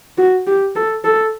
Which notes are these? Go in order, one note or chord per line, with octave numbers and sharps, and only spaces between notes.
F#4
G4
A4
A4